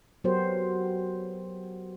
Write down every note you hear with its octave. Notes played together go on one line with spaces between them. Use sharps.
F#3 B3 F#4 G4 A#4 C5